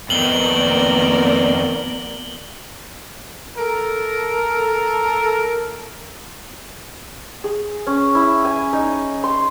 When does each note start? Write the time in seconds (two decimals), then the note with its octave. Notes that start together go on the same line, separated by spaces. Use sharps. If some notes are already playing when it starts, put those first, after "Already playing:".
0.10 F2 D#3 A#3 B3 A#4 D5 F#7 G7
3.57 A4 A#4
7.44 G#4
7.87 C#4
8.15 E4
8.45 G#5
8.73 D#4
9.24 C6